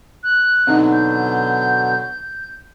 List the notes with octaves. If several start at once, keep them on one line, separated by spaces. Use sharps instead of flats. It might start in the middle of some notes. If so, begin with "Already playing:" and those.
F#6
B2 D3 F#3 C4 D#4 D#5
G6